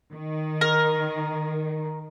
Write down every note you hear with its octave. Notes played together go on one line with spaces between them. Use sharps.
D#3
A#4